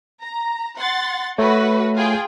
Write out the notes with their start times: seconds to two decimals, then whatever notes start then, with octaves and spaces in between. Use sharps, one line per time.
0.22 A#5
0.77 F#5 C6 A6
1.38 A3 F#4 B4 C#5
1.96 F4 G#4 G5